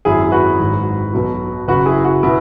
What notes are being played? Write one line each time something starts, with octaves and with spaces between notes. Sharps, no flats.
G#1 F#2 F#3 E4 G#4
F#4 B4
G#1 G#2 F#3
B1 B2 F#3
F#1 F#2 F#3 F#4 B4
E4 G#4
F#4
B2 B3 E4